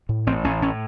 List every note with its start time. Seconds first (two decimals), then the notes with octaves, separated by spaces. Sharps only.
0.09 A2
0.27 A1 C4
0.44 A1 C#4
0.62 A2 C#4